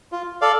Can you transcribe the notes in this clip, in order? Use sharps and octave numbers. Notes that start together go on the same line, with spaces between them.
F4
A4 D5 F5